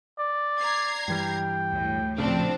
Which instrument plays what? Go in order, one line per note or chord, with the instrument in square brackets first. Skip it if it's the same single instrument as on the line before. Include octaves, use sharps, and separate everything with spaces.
[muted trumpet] D5
[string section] A#5 G#6 C7
[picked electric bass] G2 E3 G3 [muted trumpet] G5
[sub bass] D2 [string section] A2
[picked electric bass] A#1 A2 C#3 [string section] F3 C4 D4